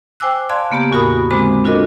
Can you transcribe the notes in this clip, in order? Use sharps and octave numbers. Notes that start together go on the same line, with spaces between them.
C5 G5 G#5 D6 E6 F#6
D5 F5 A5 C6 F#6 G#6
C#3 A#3 B3 G4 A#5
E2 A2 F#4 A#4 B5 D#6
D3 G#3 C4 C5 B5 D6
D4 F4 F#4 A4 A#4 D#5